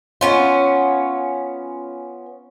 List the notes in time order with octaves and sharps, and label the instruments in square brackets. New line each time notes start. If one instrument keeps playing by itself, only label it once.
[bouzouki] B3 C#4 F4